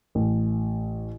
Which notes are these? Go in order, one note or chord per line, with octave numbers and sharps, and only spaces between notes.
A1